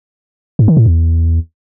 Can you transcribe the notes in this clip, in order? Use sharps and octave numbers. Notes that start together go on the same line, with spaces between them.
G#2
D#3
A2
E2